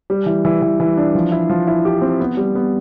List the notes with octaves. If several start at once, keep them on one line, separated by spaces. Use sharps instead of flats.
G3
E3
E3
E3
E3
D4
F3
E4
F3
E4
G4
C4
B3
G3
B3